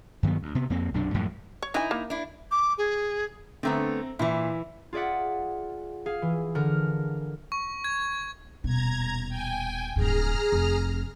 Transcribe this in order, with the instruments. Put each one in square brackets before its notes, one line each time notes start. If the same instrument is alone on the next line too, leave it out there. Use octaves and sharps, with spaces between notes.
[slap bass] G2 D#3 F#3 B3
D2
C3 B3
F2 A#3 C4
B1 F#2 C3 D4
F#2 A2 F3 G#3
[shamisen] C#5
[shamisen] E3 G#5 [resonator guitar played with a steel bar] D#4 E4
[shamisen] A#3
[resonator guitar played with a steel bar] D4 E4
[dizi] D6
G#4
[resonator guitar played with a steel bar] D3 A3 B3 [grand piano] C4 A#5
[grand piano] A#2 [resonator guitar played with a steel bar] E3 E4
[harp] F4 G#4 D5 E5 F#5
G#4 F5
E3
D3 A#4 F6
[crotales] C#6
G#6
[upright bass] D#1 B2 [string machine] A#5 G#6
[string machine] G5 G#5
[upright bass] D1 G2 [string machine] G#4 A#5 F6
[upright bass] F1